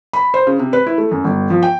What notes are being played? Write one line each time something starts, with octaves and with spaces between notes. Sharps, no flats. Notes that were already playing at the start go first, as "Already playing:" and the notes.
B5
C5
C#3
C3
B4
E4
A3
F#2
G1
F3
G5